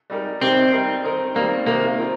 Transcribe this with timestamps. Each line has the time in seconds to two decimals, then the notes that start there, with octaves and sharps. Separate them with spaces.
0.10 G3 D#4 G4 A#4
0.41 C3 D#3 G3 C4 D#4 G4
0.73 G3 D#4 A#4
1.04 D#3 C4 D#4 A#4
1.35 D#3 G3 A#3 C4
1.66 C3 D#3 A#3 C4 G4 A#4
1.98 C4 F4 A#4